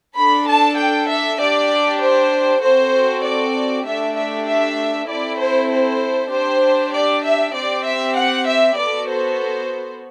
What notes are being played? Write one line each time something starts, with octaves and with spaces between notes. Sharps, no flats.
D4 A4 B5
A5
G5
E5
D4 G4 D5
C5
C4 F#4 A4 C5
D5
A3 D4 G4 E5
E5
E5
C4 E4 A4 D5
C5
C5
D4 G4 C5
D5
E5
C4 G4 D5
E5
F#5
E5
B3 F#4 A4 D5
C5